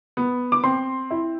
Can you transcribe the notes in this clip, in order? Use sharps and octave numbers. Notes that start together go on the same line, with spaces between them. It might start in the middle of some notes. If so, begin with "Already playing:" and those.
B3
D6
C4 C6
E4